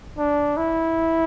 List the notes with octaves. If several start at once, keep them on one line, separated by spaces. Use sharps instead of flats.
D4
E4